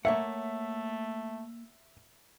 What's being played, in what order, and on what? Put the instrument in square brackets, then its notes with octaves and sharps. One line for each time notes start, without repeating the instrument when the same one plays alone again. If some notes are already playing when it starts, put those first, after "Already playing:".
[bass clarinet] A3 [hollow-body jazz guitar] A#3 C#5 F#5 [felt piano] E5